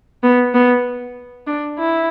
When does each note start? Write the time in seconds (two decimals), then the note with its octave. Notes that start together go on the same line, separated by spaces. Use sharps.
0.23 B3
0.54 B3
1.47 D4
1.78 E4